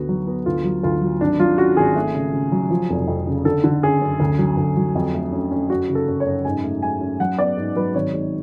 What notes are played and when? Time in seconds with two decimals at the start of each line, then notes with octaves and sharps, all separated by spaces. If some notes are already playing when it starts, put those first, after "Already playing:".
Already playing: D2 B3 F#4
0.09 F#3
0.27 B3
0.46 D2 F4
0.64 F#3
0.83 D2 F4
1.01 F#3
1.21 G#1 D4
1.39 F#3 F4
1.58 C#4 F#4
1.77 G#1 G#4
1.95 A3
2.14 C#3
2.33 C#3
2.52 F#3
2.70 F3
2.90 F1
3.08 F2
3.27 C#3
3.45 D3 A4
3.64 D3
3.83 C#4 G#4
4.01 F#2
4.20 D2
4.39 F#3
4.57 D2
4.77 F#3
4.95 F2
5.14 A3
5.32 C#4
5.51 C#4
5.70 F#2 F#4
5.89 C#3
5.95 A4
6.08 F#2
6.20 C#5
6.26 F#2
6.45 G#2 G#5
6.64 A3
6.82 A3 G#5
7.01 C#4
7.20 F#3 F#5
7.39 B3 D5
7.57 G#2
7.76 F#3 B4
7.95 G#1 C#5
8.14 G#2